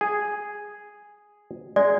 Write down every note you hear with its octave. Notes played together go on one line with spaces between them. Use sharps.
G#4
G#3 D5